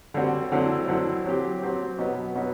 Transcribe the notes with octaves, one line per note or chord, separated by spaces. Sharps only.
D3 G3 C4 F#4
D3 F#3 C4 E4
D3 F#3 C4 E4
F#3 C4 G4
F#3 C4 G4
B2 F#3 B3
B2 F#3 B3